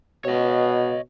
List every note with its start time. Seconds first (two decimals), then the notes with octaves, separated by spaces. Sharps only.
0.25 B2 C#5 D#5